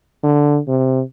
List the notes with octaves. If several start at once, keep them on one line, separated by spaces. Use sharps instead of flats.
D3
C3